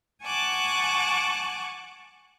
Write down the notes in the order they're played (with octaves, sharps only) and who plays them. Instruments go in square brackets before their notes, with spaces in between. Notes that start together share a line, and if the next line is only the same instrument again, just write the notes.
[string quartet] F#5 G#5 A5 C#6 D6 F#6